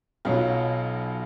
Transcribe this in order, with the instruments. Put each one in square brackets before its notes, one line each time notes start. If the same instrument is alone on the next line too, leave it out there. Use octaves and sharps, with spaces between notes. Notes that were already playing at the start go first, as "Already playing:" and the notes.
[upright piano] B1 B2 F#3 F4